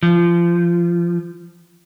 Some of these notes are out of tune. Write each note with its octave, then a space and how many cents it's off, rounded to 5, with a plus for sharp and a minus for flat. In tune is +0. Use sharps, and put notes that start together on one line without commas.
F3 -25